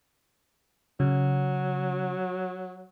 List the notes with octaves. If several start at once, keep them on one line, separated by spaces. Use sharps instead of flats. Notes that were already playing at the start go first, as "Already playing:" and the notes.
C#3 F#3